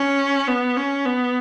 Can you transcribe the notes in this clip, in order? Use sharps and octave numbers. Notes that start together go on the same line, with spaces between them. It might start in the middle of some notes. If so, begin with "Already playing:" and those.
Already playing: C#4
B3
C#4
B3